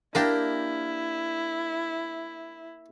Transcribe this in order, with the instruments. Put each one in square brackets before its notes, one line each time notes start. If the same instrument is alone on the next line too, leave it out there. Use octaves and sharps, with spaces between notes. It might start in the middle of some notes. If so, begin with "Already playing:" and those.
[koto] A#3 D4 G4 [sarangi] E4 [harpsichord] A#4 G5